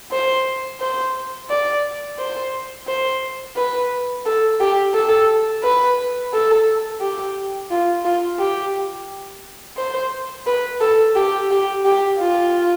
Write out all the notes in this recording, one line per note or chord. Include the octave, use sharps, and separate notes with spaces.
C5
C5
D5
C5
C5
B4
A4
G4
A4
B4
A4
G4
F4
F4
G4
C5
B4
A4
G4
G4
G4
F4